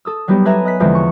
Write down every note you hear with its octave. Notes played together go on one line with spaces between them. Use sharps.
A4 D#6 E6
F#3 G3 B3 D#4 G4
A4 B4 E5 G#5 A#5
D#5 F#6 B6
E2 D3 E3 F3 G#3 C4
C#6